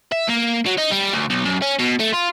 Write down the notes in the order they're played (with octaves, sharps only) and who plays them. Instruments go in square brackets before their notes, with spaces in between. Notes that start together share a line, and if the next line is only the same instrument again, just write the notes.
[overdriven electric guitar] E5
A#3
F#3
D#4
G3
D2
B1
F#2
C#4
B2
A3
F4